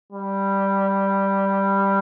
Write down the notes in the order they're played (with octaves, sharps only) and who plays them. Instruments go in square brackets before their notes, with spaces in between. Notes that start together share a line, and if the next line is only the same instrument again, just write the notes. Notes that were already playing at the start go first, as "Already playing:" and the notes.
[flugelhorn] G3